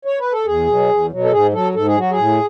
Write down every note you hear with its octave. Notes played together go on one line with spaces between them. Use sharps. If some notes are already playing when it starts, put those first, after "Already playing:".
C#5
B4
A4
E2 G#4
B2 F#3
E2
B2 F#3
A4
G#2 G#4
F#3 A4
G#2 A4
G#4
F#3 F#4
G#4
A2